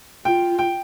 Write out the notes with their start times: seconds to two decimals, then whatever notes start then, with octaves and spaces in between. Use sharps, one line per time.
0.25 F4 G5
0.59 G5